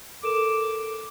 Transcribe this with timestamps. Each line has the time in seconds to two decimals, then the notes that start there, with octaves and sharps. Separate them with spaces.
0.23 A4 A#4 D6 E7